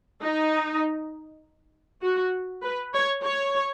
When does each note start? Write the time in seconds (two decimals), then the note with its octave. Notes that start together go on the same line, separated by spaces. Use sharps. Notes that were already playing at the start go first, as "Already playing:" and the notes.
0.22 D#4
2.02 F#4
2.63 B4
2.93 C#5
3.23 C#5